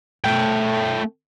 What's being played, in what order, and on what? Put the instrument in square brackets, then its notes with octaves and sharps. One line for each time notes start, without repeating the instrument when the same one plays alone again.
[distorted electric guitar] A3 G5